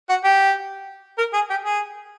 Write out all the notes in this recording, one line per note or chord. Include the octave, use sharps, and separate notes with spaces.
F#4
G4
A#4
G#4
G4
G#4